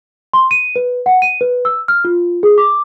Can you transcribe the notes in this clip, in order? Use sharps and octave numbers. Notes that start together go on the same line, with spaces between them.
C6
D#7
B4
F#5
D#7
B4
E6
F6
F4
G#4
D6